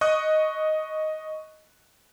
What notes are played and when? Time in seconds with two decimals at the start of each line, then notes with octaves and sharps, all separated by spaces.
0.01 D#5 C#6 D#6 F#6